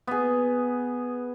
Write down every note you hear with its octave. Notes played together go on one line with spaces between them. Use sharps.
B3 G#4